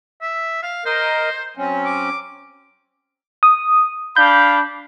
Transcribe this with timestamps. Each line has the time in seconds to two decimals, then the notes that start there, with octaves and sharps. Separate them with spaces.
0.21 E5
0.63 F5
0.86 A#4 C5 D#5
1.57 F#3 C4 C#4
1.85 D6
3.43 D#6
4.16 D4 F5 B5 G6